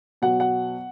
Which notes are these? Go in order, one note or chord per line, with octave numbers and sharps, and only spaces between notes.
B2 F#3 F#5
F#5